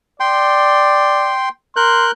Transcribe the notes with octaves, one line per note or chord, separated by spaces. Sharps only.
D5 G5 C6
A#4 C6 F#6 G6